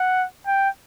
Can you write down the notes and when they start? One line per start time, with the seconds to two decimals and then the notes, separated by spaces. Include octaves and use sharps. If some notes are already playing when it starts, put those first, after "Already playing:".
Already playing: F#5
0.47 G5